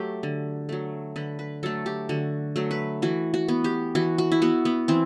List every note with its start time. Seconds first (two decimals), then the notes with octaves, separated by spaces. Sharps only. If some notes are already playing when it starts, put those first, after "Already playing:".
Already playing: F#3 A3 G4
0.23 D3
0.69 F#3 A3
1.16 D3 B4
1.39 B4
1.63 F#3 A3 A4
1.86 G4
2.09 D3 F#4
2.56 F#3 A3
2.71 B4
3.02 E3 F#4
3.34 F#4
3.48 B3
3.64 G4
3.95 E3 F#4
4.18 F#4
4.32 E4
4.42 B3 F#4
4.65 B3
4.88 E3 C4